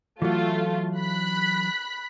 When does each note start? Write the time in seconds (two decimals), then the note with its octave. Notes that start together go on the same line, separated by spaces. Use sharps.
0.22 E3 F#3 A3 F4
0.99 B5 F#6 B6